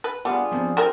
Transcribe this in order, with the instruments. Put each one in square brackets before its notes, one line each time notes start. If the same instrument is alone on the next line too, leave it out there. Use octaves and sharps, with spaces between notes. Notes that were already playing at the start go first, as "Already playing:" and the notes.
[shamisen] B4
[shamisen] G3 [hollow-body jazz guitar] B3 F5 [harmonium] D4 F4 G#4
[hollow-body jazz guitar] F3 B3 C4
[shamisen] F#3 C4 A#4 [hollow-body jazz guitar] C5